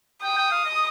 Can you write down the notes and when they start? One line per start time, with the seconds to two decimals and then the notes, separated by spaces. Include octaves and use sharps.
0.23 G5 D#6
0.38 G5
0.51 F5
0.65 D#5